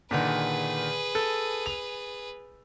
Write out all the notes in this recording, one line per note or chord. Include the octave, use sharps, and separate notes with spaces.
A#2 D3 D#3 G#4 B4
A4
F7